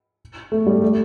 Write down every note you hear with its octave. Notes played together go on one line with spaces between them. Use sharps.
A3
G3
A3